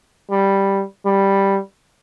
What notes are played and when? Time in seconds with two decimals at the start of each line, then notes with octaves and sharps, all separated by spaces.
0.31 G3
1.06 G3